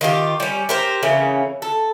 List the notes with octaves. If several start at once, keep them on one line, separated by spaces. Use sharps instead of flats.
D#3 F4 G4
G3 C#4
G4 A#4 C5
C#3 E3 A#3 C#4
A4